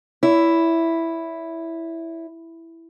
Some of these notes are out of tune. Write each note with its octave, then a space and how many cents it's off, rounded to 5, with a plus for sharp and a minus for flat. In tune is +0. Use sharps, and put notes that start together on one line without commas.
E4 +0 C#5 +40